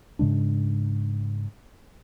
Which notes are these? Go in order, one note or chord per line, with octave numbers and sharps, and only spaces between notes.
G#2 C#3 G#3 D4